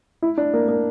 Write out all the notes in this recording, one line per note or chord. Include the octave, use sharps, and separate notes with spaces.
E4
D4
A#3
A#3